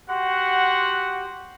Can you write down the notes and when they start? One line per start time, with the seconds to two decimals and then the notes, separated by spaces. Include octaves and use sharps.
0.10 F#4 G4 F#5 C6